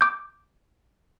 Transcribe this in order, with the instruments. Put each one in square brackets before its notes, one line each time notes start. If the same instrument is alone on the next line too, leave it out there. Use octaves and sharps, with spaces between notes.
[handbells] D6 G6